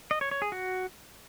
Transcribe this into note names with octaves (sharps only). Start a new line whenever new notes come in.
D#5
C#5
C#5
G#4
F#4